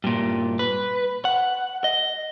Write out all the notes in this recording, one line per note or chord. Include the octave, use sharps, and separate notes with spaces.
G2 A#2
B4
F#5
D#5